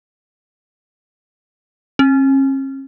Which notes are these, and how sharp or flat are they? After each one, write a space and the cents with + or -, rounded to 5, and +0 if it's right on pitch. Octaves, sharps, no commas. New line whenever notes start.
C#4 -45